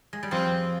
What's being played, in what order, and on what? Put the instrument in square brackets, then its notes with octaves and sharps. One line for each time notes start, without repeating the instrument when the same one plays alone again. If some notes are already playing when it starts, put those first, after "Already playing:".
[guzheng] G#3
G3
[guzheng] F2 F3 [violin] C4